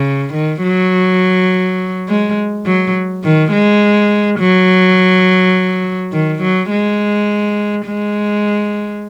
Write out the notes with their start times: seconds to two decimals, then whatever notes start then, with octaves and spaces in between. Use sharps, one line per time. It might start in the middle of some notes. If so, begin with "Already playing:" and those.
Already playing: C#3
0.34 D#3
0.63 F#3
2.08 G#3
2.66 F#3
3.24 D#3
3.52 G#3
4.40 F#3
6.12 D#3
6.42 F#3
6.71 G#3
7.86 G#3